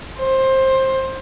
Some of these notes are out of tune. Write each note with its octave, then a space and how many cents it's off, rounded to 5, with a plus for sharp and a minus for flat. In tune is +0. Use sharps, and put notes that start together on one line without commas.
C5 +20